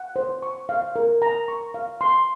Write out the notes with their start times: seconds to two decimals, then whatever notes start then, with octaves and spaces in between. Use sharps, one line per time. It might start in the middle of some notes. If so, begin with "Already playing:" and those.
Already playing: F#5
0.16 C5
0.43 C#6
0.69 F5
0.96 A#4
1.22 A#5
1.48 C#6
1.74 F5
2.01 C6